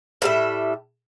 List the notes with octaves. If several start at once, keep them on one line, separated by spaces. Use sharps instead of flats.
A2 G3 E5